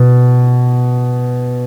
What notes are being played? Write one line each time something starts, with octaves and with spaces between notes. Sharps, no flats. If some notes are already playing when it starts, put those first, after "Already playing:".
Already playing: B2